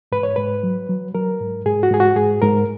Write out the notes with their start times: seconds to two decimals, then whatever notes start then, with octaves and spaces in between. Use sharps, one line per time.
0.12 G#2 B4
0.23 C#5
0.36 G#2 B4
0.63 F#3
0.89 F#3
1.14 F#3 A#4
1.41 G#2
1.66 G#2 G#4
1.83 F#4
1.91 G#2 G#4
2.00 F#4
2.16 G#2 G#4
2.42 G#2 A#4